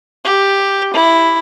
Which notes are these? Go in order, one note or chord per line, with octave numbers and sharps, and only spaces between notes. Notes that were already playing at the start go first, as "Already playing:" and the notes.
G4
E4